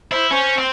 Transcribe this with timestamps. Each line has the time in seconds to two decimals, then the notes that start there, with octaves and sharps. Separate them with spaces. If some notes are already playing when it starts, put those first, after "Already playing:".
0.11 E4 C5
0.31 C#4 C5
0.58 C4